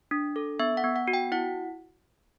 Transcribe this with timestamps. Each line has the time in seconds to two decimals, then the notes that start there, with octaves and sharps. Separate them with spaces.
0.11 D4
0.36 A4
0.59 B3 E5
0.77 F#5
0.84 B3
0.96 F#5
1.08 F#4
1.13 G5
1.32 E4 F#5